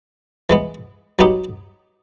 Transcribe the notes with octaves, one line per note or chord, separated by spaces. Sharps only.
E3 G#3 B3
F#3 B3 D#4 G4